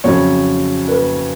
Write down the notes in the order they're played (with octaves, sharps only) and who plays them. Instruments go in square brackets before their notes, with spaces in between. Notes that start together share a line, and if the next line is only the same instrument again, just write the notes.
[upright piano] F2 C#3 F#3 C#5
B4